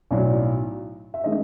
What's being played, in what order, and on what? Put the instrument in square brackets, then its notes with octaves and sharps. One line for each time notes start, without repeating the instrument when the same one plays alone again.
[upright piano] B1 A2 F#3 D5
E5
D#3 G#3 C#4 D#5